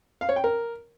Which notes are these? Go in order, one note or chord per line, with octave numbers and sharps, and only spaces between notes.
F5
C#5
G5
A#4